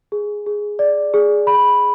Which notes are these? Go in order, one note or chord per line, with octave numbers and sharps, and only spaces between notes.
G#4
G#4
D5
G#4
B5